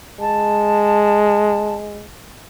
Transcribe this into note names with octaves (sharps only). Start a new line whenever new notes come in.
G#3 A5